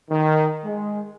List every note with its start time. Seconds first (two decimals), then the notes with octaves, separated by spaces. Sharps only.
0.10 D#3
0.64 G#3